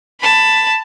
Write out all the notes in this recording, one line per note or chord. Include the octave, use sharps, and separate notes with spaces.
A5 B5